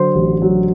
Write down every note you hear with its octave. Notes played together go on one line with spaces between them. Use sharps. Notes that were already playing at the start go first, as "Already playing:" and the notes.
Already playing: D3 F#3 C5
A1
F#3